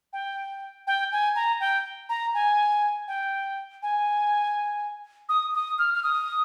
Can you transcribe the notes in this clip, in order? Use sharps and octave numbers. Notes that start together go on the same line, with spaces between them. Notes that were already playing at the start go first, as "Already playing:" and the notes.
G5
G5
G#5
A#5
G5
A#5
G#5
G5
G#5
D#6
D#6
F6
F6
D#6